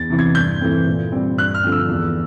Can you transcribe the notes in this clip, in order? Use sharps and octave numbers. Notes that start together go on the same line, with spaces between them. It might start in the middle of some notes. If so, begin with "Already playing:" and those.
Already playing: E2 A6
C3 E3
G#6
G2 G6
E3 A3 C4
A#2
G3 C4
G2 F#6
F6
D3 F3 A3 C4
E6
E2